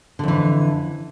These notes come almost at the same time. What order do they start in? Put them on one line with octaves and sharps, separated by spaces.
D3 F2 E3